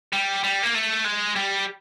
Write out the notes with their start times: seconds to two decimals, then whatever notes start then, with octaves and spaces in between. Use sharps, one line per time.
0.13 G3
0.44 G3
0.63 A#3
0.75 A3
1.05 G#3
1.36 G3